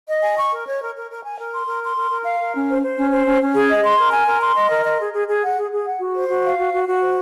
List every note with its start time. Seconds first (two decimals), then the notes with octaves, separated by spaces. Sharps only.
0.09 D#5
0.23 G#5
0.37 C#6
0.51 A#4
0.66 C#5
0.81 A#4
0.95 A#4
1.10 A#4
1.23 G#5
1.39 A#4
1.53 C6
1.67 A#4
1.82 C6
1.96 A#4
2.11 A#4
2.25 F5
2.40 A#4
2.54 C#4
2.68 C5
2.83 C5
2.97 C#4
3.12 C5
3.26 C#4
3.41 C#4
3.55 G#4
3.69 D#5
3.84 C6
3.98 A#4
4.12 G#5
4.27 A#4
4.41 C6
4.56 D#5
4.70 A#4
4.85 D#5
4.99 G#4
5.13 G#4
5.28 G#4
5.42 F#5
5.57 G#4
5.71 G#4
5.86 F#5
6.00 F#4
6.15 C5
6.29 F#4
6.44 F5
6.58 F#4
6.73 F#4
6.87 F#4
7.01 C5